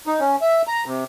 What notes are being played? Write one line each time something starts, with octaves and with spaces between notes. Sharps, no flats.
D#4
C#4
E5
A#5
C3